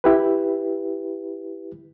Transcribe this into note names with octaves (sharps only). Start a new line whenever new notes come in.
E4 G4 B4